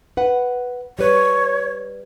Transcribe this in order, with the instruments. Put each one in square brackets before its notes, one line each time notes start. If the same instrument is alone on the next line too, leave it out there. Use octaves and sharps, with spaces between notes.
[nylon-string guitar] B4 F#5
[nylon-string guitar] G3 B4 [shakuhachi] C#5